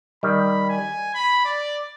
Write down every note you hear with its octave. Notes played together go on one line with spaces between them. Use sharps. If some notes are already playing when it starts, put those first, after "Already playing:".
D#3 G3 B5
G#5
B5
D5